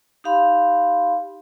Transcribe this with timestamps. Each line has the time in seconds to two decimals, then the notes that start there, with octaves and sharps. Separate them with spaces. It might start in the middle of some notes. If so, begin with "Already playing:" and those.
0.24 D#4 G4 F5 B5 C6